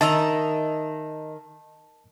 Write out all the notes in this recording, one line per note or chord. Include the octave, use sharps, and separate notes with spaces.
D#3 D#5 E5 A5 A#5